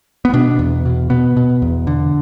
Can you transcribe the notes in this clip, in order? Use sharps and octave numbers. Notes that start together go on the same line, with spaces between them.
B3
B2 D4
E2
B2
B2 B3
B2
E2
D3